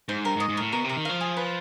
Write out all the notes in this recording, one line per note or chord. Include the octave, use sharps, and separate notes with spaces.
G#2 C5
G2 A#4
G#2
D#5
G#2
A2 A#4
B2 A#4
C3
A#4
D#3
F3 F5
G#4
B4